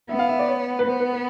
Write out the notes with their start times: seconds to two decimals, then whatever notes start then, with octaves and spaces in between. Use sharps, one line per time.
0.09 B3 E5
0.19 F5
0.29 E5
0.39 D5
0.48 C#5
0.79 B4
0.87 B3 C5
1.00 B4
1.13 B4